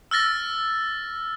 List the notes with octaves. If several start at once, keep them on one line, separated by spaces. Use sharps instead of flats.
E6 F6 A6 A#6